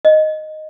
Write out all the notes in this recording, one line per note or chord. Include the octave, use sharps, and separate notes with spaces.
D#5